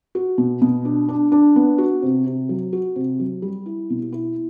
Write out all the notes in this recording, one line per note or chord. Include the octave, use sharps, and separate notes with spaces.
F#4
B2
B2
D4
D4
D4
B3
F#4
C3
C3
F#3
F#4
C3
F#3
G3
E4
B2
E4